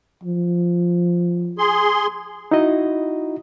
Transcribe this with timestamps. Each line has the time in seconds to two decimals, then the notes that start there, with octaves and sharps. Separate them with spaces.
0.24 F3
1.58 G#4 C6
2.51 D#4 E4 F#4 D#5